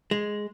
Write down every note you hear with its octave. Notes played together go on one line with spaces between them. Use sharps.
G#3